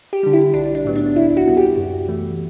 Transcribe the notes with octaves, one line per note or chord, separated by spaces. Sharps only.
G4
D3 G3
E4
B1 D4
D4
A2 F#3 B3
D4
D2 E4
F#4
C3 G3 B3
G4
F#2
E3 A3